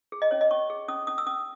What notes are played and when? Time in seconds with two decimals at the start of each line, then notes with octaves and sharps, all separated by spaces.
0.12 G#4
0.22 D#5
0.31 C#4 C#5
0.41 D#5
0.51 C#4 C#6
0.70 G#4
0.88 C#4 D#6
1.07 C#4 D#6
1.18 E6
1.27 C#4 D#6